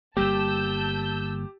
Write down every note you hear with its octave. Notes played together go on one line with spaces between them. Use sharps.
G1 G3 A#3 G4 A5 E6 G6